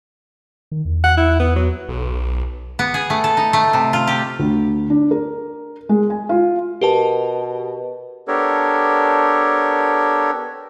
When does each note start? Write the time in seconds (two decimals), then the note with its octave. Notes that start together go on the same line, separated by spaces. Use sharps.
0.72 D#3
0.85 E2
1.04 F#5
1.17 E4
1.40 B3
1.56 F#3
1.89 B1
2.79 B3
2.94 G#4
3.10 A3
3.24 A4
3.37 D#4
3.53 A3
3.73 C3
3.93 F4
4.08 G4
4.39 D2
4.90 D4
5.11 A#4
5.89 G#3
6.10 G#5
6.29 F4
6.81 B2 G4 A#4 A5
8.28 B3 D4 G4 A4 A#4 C#5